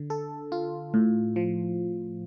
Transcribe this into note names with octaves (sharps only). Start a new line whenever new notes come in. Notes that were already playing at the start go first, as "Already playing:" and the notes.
Already playing: D3
A4
F4
A2
F3